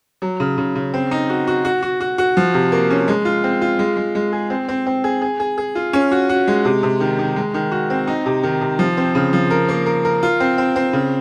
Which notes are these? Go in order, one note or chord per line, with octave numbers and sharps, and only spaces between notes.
F#3
C#3
C#3
C#3
C4
D#4
F#4
F#4
F#4
F#4
F#4
F#4
F3
C3
A#3
C#4
G#3
F4
C4
F4
G#3
G#3
G#3
G#4
C4
C4
C4
G#4
G#4
G#4
G#4
F4
C#4
F#4
F#4
G#3
C3
C3
D#3
D#3
G#3
D#3
F#4
C4
D#4
C3
D#3
C3
F3
C4
C#3
F3
A#4
A#3
A#4
A#4
F4
C4
C4
C4
C#3